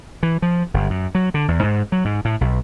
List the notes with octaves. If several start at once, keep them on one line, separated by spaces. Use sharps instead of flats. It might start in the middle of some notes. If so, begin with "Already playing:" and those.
E3
F3
G1
F#2
F#3
D3
E2
G#2
F#3
G#2
A2
B1